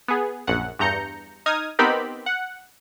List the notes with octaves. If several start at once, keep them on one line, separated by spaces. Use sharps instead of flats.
B3 G#4
A#1 F#2 F#5
E2 G2 A#5 G6 C#7
D#4 D#6 F6 G#6
B3 C4 D#4 G4 A#4 B5
F#5